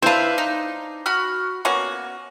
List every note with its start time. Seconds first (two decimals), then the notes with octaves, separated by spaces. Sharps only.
0.02 C4 D4 E4 B4 C5 F5
0.38 D#4
1.06 F#4 B5 F6
1.65 A#3 B3 C#4 F#4